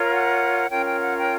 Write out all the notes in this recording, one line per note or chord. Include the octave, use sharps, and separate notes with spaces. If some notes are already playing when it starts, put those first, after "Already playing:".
Already playing: F4 A#4 C#5
F#5
C#4 F4 A#4 C#5 G5
G5
F#5
G5